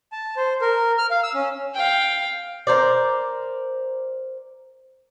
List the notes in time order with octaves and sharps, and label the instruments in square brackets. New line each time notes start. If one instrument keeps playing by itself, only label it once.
[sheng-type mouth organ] A5
C5
A#4
F6
F5
E6
C#4
[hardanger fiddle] F5 G5
[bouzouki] A#4 C5 D5